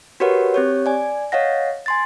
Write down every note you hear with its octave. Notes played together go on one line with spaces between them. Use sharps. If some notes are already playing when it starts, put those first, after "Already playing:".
F#4 G4 A#4 B4 C#5 F#5
C4 G4 C#5
D5 G#5
C#5 D#5 F5 F#5 A#6
G#5 C6 A6